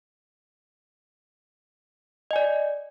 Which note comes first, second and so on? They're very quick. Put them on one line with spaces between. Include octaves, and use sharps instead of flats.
D#5 G#5 D5